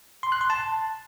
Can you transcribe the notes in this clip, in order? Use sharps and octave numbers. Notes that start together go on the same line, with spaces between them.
C6
F#6
C6
A5